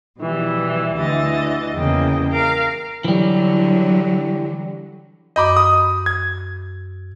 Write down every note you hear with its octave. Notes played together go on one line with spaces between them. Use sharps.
B2 E3 F3 G3
D2 D3 E3 D#5 A6
E2 C#3 A#3 D#5 G5
A#4 F5 D6
D3 E3 F#3 G3
F#2 D#5 B5 D6 G6
D#6
G#6